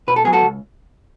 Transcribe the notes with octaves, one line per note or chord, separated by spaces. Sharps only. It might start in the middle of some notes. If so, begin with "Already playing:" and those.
B2 B4
A4
F#3 B3 G#4
F#4 A4
C#2